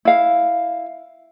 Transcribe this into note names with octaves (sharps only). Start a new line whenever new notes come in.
E4 F5